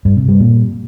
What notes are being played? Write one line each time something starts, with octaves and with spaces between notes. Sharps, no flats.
G2
C3
G3
A#2